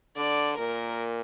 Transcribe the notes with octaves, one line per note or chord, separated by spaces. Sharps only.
D3 D5
A#2 A#4